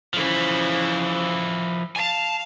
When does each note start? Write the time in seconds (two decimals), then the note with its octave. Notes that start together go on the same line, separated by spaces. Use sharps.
0.14 C#3 E3 F3 E4 C5
1.96 F5 G#5 A5